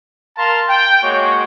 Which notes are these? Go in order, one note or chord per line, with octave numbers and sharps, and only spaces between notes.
A#4 F5 A5 A#5 C6
G5
G#3 A#3 F#4 C#5